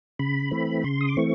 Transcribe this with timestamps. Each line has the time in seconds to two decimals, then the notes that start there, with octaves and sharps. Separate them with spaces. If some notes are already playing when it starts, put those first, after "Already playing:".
0.19 C#3 B5
0.51 E3 A3 C4
0.84 C#3 C6
1.01 D#6
1.09 D6
1.17 E3 A3 C4 C#6